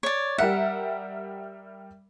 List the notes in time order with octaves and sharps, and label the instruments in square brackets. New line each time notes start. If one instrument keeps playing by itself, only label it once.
[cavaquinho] C#5 D5
[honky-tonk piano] G3 A#4 E5 [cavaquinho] F#5